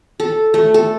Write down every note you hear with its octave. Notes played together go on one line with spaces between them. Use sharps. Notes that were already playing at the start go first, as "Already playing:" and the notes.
A4
A3
A4